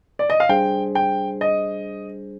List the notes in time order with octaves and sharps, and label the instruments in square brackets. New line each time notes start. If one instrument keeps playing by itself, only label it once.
[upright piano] D5
D#5
F5
[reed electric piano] G3 D4 G#4 C5 [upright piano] G5
[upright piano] G5
D#5